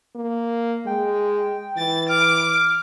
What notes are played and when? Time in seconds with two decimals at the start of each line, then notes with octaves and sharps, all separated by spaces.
0.16 A#3
0.87 G#3 G5
1.78 E3 A6
2.09 D6 F6